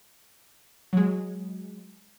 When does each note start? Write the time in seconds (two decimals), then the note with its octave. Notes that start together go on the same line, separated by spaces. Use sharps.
0.93 F#3 G#3